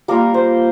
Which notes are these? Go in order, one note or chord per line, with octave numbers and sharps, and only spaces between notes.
G3 A#3 F4 A#4
C5